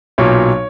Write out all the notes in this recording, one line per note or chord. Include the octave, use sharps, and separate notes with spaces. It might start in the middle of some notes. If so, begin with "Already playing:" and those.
B1 A#2 F#3 C#5